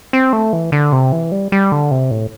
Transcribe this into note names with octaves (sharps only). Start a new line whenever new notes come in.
C4
A3
E3
D3
C3
E3
G3
G3
D3
C3
A2